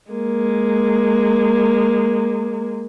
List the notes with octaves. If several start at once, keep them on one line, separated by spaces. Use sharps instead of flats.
G#3 A#3